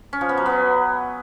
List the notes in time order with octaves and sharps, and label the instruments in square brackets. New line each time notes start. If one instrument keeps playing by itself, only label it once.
[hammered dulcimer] C#4
F3
B3
F#3
B3